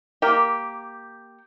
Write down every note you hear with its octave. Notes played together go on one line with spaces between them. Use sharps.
A#3 G4